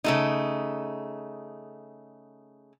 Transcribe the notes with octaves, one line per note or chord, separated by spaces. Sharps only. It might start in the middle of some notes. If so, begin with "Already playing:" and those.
C#3 A3 D#4